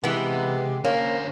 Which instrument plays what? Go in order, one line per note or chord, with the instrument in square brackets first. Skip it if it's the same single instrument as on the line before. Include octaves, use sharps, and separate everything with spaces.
[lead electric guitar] C3 [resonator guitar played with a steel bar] E3 B3 [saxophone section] G#3 G4
[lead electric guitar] D3 C5 [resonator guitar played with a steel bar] A#3 [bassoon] C#4